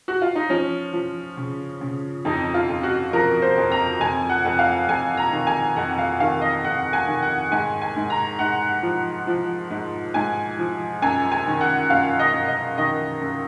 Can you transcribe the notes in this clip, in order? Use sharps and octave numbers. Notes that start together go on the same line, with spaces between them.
F#4
F4
D#4
F3 C#4
F3
C#3
C#3
F2 D#4
F4
F2
F#4
F3 A#4
C5
F2
A#5
F2 G#5
F#5
F2
F5
F2 G#5
A#5
D#3
G#5
F2 F#5
F5
D#3 F5
D#5
F2 F#5
G#5
D#3
F#5
G#2 G#5
G#5
G#2
A#5
G#2 F#5
F3
F3
G#2
G#2 G#5
F3
F#2 G#5
G#5
D#3
F#5
F#2 F5
D#5
F#2
D#5
D#3 D#5
F#2